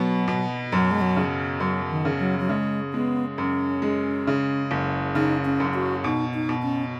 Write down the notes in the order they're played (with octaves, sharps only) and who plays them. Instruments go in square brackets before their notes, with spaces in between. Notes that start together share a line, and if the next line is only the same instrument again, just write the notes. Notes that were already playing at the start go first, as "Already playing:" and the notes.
Already playing: [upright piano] B2 B3 [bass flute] F#3
[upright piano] B2
[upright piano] F#2 [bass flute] F#3
[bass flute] G#3
F#3
[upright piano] C#3
[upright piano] F#2 [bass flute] F#3
[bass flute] D#3
[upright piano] C#3
[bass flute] F#3
F#3
[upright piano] C#3 [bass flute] G#3
[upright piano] G#3 [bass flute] B3
[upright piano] F#2 [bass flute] C#4
[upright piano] G#3
C#3
F#1
[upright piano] C#3 [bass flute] D#4
[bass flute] C#4
[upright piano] F#2
[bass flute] F#4
[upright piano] B2 [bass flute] D#4
[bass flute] D#4
[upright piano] B2
[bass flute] C#4